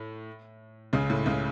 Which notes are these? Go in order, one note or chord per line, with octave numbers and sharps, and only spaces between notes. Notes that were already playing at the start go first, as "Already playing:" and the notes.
Already playing: A2
C#2 C#3
A2
C#2 C#3